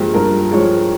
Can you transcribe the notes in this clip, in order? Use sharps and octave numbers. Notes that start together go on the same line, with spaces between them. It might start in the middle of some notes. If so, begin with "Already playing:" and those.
Already playing: G2 F3 G#3 A#3 G4
G2 A#4
F3 G#3 C#5